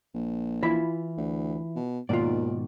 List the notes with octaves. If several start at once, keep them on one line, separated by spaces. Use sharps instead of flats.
A#1
E3 E4 F4 B5
D2
B2
D#2 G#2 B2 D#3 F4 D5